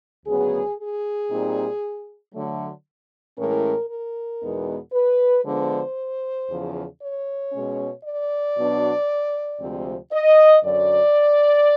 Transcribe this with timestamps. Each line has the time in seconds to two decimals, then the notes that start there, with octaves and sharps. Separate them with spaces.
0.26 D2 C#3 F#3 B3 G#4
0.78 G#4
1.29 A#2 G3 C4 D#4
2.33 D3 F#3 A3
3.37 A2 E3 G#3 C#4 A#4
3.89 A#4
4.41 E2 B2 G#3 B3 D#4
4.92 B4
5.44 D3 F3 G#3 B3 D4 C5
6.48 E2 C#3 F3
7.00 C#5
7.52 B2 G#3 C#4
8.04 D5
8.56 B2 F#3 B3 D4
9.59 D2 C3 F3 G#3 C4
10.11 D#5
10.63 F#2 D3 F#3 D5